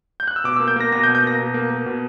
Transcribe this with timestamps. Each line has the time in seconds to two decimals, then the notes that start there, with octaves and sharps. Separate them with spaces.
0.20 G6
0.28 F#6
0.36 E6
0.44 B2 D6
0.56 A#3 E6
0.68 G6
0.76 A#3 A#6
0.92 B2 A#6
1.03 G6
1.08 B2
1.15 G6
1.24 A#3 A#6
1.39 B2
1.54 A#3
1.70 A#3
1.86 B2